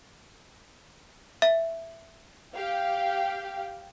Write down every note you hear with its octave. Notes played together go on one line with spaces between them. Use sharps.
E5
G4 F5 G5